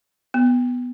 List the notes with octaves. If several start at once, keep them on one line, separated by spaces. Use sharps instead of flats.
B3